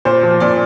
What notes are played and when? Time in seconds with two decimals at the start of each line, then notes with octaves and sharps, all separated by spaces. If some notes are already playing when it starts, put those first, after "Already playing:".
0.05 A#2 C5
0.23 F3
0.40 A#2 D5